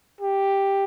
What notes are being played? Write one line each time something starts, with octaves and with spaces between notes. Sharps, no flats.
G4